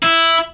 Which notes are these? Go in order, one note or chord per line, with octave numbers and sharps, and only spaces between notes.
E4